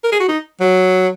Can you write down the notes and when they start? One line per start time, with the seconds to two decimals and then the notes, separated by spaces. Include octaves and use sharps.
0.04 A#4
0.12 G#4
0.20 F#4
0.29 D#4
0.60 F#3